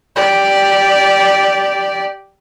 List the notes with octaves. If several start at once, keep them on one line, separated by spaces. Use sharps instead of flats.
G4 D5